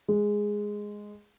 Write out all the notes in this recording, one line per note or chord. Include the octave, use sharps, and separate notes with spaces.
G#3